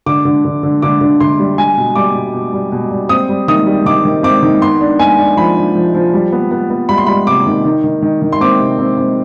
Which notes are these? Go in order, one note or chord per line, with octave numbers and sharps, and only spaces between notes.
D3 D6
D3
D3
D3
D3 D6
D3
D3 C6
G3
G3 G#5
B2
G3 D6
B2
B2
G3
B2
G3
C4 D#6
G3
D#3 D#6
G3
D#3 D6
D#3
C4 D6
D#3
B3 C6
D4
B3 G#5
D4
F3 B5
D4
F3
F3
G3
B3
B3
B3
G3 B5
C6
G3 B5
C3 D6
D#3
D#3
D#3
D#3
D#3
C6
C4 D6
C3
C4
C4